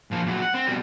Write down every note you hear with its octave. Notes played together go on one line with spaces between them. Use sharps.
A#2 F3
A#2 F#3
F#5
C4
B2 G3